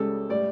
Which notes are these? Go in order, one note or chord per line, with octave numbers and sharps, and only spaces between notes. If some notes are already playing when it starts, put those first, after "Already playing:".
Already playing: C#2 C#3 G3 A4
A2 G3 D5